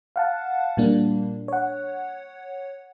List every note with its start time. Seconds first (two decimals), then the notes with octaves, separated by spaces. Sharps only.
0.16 F5 F#5 A5
0.77 A#2 G3 A#3 D4
1.48 C#5 F#5